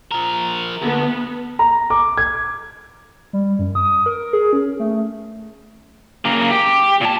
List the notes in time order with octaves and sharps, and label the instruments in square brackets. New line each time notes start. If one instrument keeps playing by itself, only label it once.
[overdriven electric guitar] F3 A#4
[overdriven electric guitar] D2 [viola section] B3
[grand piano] A#5
D6
G#6
[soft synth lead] G3
F#2
D#6
A#4
G#4
C#4
A3
[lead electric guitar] C#3 A#3
G4
A#2 A5